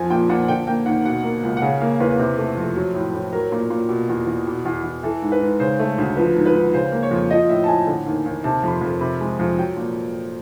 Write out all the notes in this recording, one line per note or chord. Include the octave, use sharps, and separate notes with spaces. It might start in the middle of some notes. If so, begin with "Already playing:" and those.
Already playing: F2 F3 G#5
A#2 G5
A#2 F#5
D3 G5
A#3 G5
D#2 F#5
B2 F#5
A#3
C#2
F#5
C#3 F5
A#3 F5
E2 B4
C3
A3
F2
F#3
A2
A2
F#3 A#4
A#2
A#2
B2
E2
E2
B2
E2
E2
E3 A4
G#2
B4
G#2
C#3 C5
A3
D2
F3 B4
G#2
B4
G#2
C#3 C5
A#3
C#5
F2
F3 D#5
A2 E5
A5
A2 G#5
D3
D#2
D#2
C3 A5
F2 B5
C6
F2
C3 B5
G#3
F2
F#3 G5
A#2